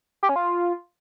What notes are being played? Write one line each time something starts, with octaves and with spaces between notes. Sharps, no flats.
G4
C#4
F4